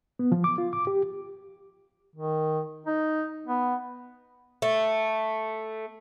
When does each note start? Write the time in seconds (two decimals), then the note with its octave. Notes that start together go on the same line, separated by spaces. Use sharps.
0.19 B3
0.32 F3
0.44 D6
0.58 F4
0.73 D6
0.87 G4
2.16 D#3
2.86 D#4
3.47 B3
4.62 A3